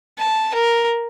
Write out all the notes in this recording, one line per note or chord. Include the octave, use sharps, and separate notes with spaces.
A5
A#4